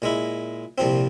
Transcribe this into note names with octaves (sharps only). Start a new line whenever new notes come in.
A#2 G#3 E4
C2 A#2 F3 C4